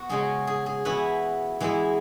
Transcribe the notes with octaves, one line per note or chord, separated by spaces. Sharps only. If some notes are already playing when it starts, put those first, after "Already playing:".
Already playing: B3 F#4
C#3 G#3 C#4 G#4
G#4
G#4
E3 B3 E4 F#4 B4
E3 G#3 B3 E4